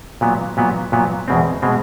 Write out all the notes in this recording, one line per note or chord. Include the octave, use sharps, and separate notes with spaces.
A#2 F#3 B3
A#2 F#3 B3
A#2 F#3 B3
E2 B2 G#3 C4
B2 G#3 C4